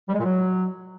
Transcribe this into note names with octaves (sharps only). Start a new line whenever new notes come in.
G3
G#3
A#2
F#3